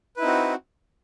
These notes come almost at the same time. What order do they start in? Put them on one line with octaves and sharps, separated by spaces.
B4 E4 D#4 C4 F#4